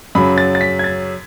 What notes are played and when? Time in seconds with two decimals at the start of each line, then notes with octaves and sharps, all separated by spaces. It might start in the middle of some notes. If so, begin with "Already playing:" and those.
0.15 F#2 C#3 F#3 C#4 B5
0.38 A6
0.55 A6
0.61 B6
0.79 G#6
0.84 A6